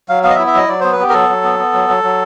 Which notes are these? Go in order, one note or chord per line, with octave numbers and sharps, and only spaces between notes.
F#3 F5
B3 F5
D#5
E5
E4
E5
F#3 D#5
F#3 D5
B3 C5
B4
B3 G4
A#4
F#3 A4
F#3
B3
B3
F#3
F#3
F#3